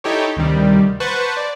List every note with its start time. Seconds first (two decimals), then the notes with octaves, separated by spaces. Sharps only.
0.04 D#4 E4 G4 A4 C#5
0.37 D2 C3 D#3 G3
1.00 B4 C5 F#5 A5 C#6
1.37 D5